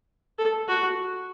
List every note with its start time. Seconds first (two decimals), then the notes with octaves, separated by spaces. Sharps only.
0.39 A4
0.68 F#4